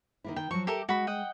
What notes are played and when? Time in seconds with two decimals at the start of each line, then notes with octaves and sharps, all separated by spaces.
0.24 D#3 A#3 E4
0.36 D#3 G5
0.51 F3 F#3 C#6
0.67 G4 A4 A#4 E5
0.89 G#3 F#4 B5
1.07 D#5 F#5 G5